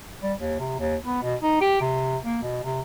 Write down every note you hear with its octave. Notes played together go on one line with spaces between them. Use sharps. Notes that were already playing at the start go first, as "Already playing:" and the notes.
G3
D#2
C3
D#2
B3
B2
D#4
G4
C3
A#3
B2
C3